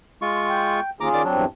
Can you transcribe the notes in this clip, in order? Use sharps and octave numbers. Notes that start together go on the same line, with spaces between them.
G#3 F4 C#6
G5
D#2 C#4 F4 G#4 A#5 D6
D#3 D5 D6
E2 G2 F#3 C4 D4